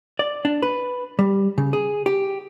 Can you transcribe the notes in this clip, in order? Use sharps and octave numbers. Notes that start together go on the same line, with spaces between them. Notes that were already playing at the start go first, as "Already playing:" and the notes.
D5
D4
B4
G3
C#3
G#4
G4